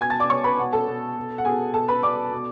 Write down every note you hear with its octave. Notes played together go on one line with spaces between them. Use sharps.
B2 G#5 G#6
A5 A6
D5 D6
B2 C#5 C#6
B4 B5
B2 F#5
A4 A5
B2
B2
F#5
B2 G#4 G#5
B2 A4 A5
B4 B5
B2 D5 D6
B2